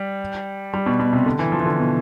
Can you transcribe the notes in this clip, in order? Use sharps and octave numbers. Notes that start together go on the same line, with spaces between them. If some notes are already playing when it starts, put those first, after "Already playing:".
Already playing: G3
G3
B2
B2
C3
D3
E3
F3
E3
D3
B2